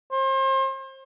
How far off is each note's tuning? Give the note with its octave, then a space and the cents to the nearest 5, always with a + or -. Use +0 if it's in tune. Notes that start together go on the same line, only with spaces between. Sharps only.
C5 +35